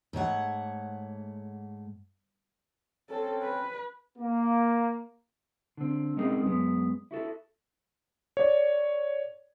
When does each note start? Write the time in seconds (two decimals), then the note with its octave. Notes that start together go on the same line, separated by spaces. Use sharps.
0.13 G#2 A3 C#5 F#5
3.10 C4 C#4 A4
3.42 B4
4.19 A#3
5.77 D3 C4
6.17 G#3 C4 C#4 D#4 G#4 A#4
6.44 F#2 G#3 B3
7.11 E4 F#4 A4
8.37 C#5 D5